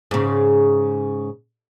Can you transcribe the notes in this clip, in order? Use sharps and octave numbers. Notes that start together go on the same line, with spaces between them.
G#2 C#3